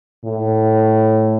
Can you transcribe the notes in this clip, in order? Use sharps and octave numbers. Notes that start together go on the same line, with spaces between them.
A2